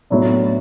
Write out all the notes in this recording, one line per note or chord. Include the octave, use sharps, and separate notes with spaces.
A2 F#3 B3 D4